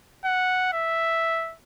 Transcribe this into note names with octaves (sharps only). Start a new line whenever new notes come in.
F#5
E5